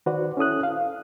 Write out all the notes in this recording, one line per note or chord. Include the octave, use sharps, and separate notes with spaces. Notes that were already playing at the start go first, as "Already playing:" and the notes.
D#3 F#4 B4 C5 D5 F#5
C#4 E4 A4 D#6 F#6
F5